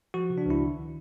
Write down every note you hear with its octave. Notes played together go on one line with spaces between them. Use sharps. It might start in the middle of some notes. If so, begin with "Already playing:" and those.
F3 F#4
C#3
D4
C#2 E4
D#3